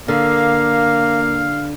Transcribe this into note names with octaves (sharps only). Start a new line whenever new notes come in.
D3 A#3 F5